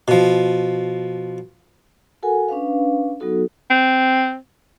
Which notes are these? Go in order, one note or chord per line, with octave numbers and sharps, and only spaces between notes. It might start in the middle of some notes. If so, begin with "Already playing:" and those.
B2 F3
F#4 A4 A#4 F#5 G#5
C#4 D4 B4 F5
F#3 B3 D#4 F#4 A4
C4